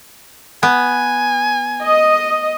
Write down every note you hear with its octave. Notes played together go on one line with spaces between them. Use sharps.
B3 G#5
D#5